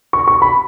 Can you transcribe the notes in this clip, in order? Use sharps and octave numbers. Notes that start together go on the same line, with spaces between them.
C#6
C#6
B5